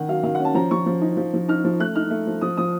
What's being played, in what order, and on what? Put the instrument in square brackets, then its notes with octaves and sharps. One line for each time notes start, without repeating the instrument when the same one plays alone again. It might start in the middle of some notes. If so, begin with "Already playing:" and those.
Already playing: [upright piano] D#3 F#5
F#3 F5
D#3 F5
C#4 F#5
A5
F3 A#5
F3 C#6
F3
D#4
F3
F3
D#4 F6
F3
A3 F#6
D#4 F6
A3
F3
F3 D#6
F3 D#6